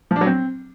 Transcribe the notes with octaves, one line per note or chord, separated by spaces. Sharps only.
F3
D4
F#3
C4